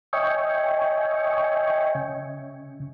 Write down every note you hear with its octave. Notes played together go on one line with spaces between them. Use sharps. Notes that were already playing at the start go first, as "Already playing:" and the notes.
C#5 D#5 E5 G5 G#5 C#6
C#3